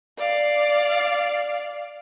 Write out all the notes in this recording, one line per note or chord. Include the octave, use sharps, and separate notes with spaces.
D5 F5